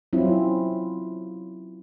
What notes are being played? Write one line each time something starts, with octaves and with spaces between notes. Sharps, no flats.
F#3 C4 C#4 E4 F4